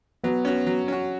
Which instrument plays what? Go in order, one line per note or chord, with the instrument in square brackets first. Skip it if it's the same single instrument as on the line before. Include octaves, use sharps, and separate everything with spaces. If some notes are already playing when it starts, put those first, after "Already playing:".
[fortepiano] F#3 [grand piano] B3 B4
[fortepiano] C#4 F#4
F#3
C#4 F#4